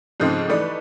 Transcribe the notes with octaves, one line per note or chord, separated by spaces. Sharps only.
G#2 C#3 F3 G#3 A3 C4
E3 G3 A3 D#4 B4 D5